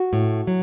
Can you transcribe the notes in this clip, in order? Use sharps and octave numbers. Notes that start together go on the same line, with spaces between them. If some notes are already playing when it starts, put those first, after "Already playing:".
Already playing: F#4
A2
F#3